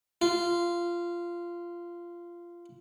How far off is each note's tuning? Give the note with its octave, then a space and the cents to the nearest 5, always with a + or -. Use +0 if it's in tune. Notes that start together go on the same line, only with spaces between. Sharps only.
F4 -15